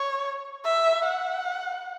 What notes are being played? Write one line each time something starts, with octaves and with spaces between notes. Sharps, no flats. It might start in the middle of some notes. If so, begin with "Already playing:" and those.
Already playing: C#5
E5
F#5